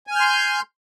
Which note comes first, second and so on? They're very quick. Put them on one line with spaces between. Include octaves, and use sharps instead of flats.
G#5 F6 G6 C6